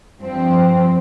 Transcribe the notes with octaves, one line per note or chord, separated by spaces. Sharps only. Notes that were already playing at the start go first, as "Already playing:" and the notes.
G2 F3 C4